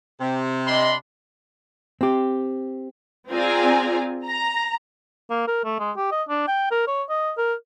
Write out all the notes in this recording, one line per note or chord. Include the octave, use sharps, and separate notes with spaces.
C3
D4 D#5 B5 C6
C4 G4
C4 F4 G#4 D5 G#5 A#5
A#5
A#3
A#4
A3
G#3
G4
D#5
D4
G5
A#4
C#5
D#5
A#4